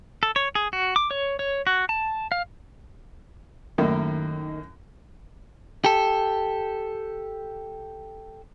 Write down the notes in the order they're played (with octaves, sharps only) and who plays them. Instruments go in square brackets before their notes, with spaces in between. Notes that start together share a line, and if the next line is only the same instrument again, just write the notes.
[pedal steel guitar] A4
C#5
G#4
F#4
D6
C#5
C#5
F#4
A5
F5
[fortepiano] F#2 A2 A#3 [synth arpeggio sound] D#3
[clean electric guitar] G4 A4